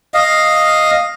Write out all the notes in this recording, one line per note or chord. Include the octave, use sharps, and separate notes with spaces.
D#5 F5